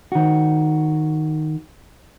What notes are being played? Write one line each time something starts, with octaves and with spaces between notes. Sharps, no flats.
D#3 F#4